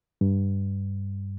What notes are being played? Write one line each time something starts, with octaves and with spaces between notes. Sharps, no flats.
G2